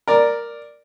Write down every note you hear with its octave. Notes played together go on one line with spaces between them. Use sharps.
A#4 D5